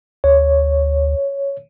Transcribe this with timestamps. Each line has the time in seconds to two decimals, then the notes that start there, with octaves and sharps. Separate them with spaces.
0.24 D2 C#5